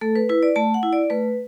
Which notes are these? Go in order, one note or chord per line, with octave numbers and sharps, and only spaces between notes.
A3 A4
B4
E4 B4
D5
A3 A5
F#5
E4
D5
A3 B4